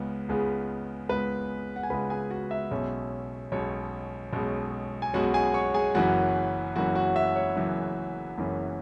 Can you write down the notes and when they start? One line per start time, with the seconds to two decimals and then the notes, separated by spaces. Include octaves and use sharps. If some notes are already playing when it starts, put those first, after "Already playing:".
Already playing: C#2 C#3 G#3 B3
0.28 C#2 C#3 G#3 B3
1.09 C#2 C#3 G#3 B3 B4 B5
1.76 F#5
1.83 G#5
1.90 C#2 C#3 G#3 B3 B4 B5
2.10 G#4 G#5
2.31 F#4 F#5
2.51 E5
2.71 B1 B2 G#3 C#4
3.52 B1 B2 G#3 C#4 C#5
4.33 B1 B2 G#3 C#4
5.02 G#5
5.14 B1 B2 G#3 C#4 F#4 F#5
5.34 G#4 G#5
5.54 C#5 C#6
5.74 G#4 G#5
5.94 F#1 F#2 E3 C#4 F#4 F#5
6.76 F#1 F#2 E3 C#4 F#4 F#5
6.95 F#4 F#5
7.16 E5
7.36 C#5
7.56 F#1 F#2 E3 C#4
8.37 F#1 F#2 E3 C#4